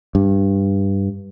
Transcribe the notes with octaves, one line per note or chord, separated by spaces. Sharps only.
G2